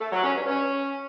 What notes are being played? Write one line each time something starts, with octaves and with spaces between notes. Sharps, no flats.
A3
F#3
C#4
G2
C#4